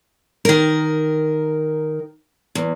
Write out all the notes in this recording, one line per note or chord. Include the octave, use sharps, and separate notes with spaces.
D#3 A#4
E2